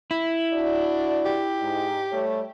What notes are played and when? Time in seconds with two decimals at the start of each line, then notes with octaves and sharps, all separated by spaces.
0.11 E4
0.54 D4 F#4 D5
1.26 G4
1.62 G#2 D#4
2.12 G3 A3 C#5